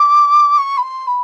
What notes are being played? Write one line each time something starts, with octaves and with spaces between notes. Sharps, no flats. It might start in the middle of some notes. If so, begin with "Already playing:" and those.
Already playing: D6
C#6
B5
C6
B5